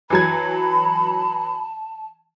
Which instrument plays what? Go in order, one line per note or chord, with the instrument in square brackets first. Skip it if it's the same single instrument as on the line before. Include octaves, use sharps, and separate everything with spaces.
[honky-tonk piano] E3 F#3 G#6 [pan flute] A5 [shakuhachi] B5